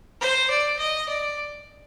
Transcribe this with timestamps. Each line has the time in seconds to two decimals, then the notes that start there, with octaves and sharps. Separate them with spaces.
0.21 C5
0.50 D5
0.79 D#5
1.09 D5